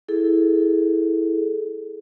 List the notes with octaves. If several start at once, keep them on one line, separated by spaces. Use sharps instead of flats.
E4 G#4 A4